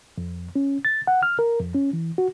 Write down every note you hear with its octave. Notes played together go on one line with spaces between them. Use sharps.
F2
C#4
A6
F#5
F6
A#4
F2
C#4
E3
F#4